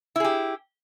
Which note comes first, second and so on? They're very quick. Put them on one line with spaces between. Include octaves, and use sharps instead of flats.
E4 G#4 G4